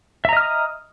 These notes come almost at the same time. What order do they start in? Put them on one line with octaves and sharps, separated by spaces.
E5 A#5 D#5 F6 D#6